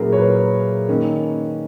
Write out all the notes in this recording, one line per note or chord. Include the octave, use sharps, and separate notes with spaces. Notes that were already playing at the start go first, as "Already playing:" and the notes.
Already playing: A#2 F#3 C#4 E4 G#4 A#4
C#5
B4
D#3 A#3 C#4